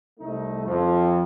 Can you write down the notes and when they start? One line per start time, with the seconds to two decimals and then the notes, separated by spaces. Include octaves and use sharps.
0.20 C2 A3 D#4
0.66 F2